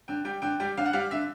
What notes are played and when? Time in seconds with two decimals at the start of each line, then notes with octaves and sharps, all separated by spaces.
0.08 D3 G5
0.25 G3 G5
0.42 D3 G5
0.60 G3 G5
0.77 D3 F5
0.86 F#5
0.93 G3 F5
1.11 D3 E5